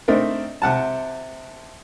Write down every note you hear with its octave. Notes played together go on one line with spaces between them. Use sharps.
A3 C4 D4 D#4 A#4
C3 F#5 A5